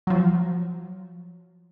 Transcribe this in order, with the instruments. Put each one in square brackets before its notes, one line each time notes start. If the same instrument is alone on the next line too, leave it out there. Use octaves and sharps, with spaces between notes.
[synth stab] F3 F#3